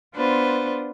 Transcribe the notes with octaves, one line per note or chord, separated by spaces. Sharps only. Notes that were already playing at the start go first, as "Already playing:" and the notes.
B3 D4 F4 B4 C5